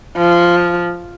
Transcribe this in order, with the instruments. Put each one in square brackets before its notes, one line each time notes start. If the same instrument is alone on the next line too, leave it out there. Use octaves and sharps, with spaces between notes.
[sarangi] F3